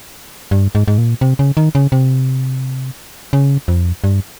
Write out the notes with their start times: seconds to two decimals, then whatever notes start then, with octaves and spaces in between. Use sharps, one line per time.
0.51 G2
0.75 G#2
0.88 G#2
0.98 A#2
1.21 C3
1.39 C#3
1.57 D#3
1.75 C#3
1.92 C3
3.33 C#3
3.68 F2
4.04 G2